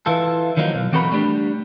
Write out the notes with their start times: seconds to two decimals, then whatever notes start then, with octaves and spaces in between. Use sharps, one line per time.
0.06 E3 F4 A4
0.57 D#3 F3 F#3 A#3 D#4
0.74 B1
0.92 E3 C4 F#4 A4 A#4 B5
1.12 G3 A3 D4 G4